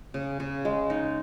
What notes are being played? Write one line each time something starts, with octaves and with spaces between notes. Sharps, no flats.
C#3
C#3
G#3
D#4